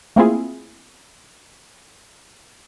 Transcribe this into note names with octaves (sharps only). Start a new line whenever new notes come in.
A3 A#3 C4 E4 F4 G#4